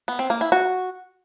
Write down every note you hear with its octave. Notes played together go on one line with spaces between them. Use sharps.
B3
C4
A#3
E4
F#4